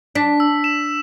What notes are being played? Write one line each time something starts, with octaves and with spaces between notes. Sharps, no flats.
D4 B6
E6
E7